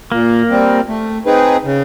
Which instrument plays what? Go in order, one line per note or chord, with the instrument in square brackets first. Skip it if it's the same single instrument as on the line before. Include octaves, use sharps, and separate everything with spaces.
[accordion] A#2 [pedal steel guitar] A#3
[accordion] G3 C4
A3
C4 D#4 G#4 B4
C#3